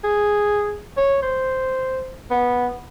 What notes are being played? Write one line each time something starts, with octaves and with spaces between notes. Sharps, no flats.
G#4
C#5
C5
B3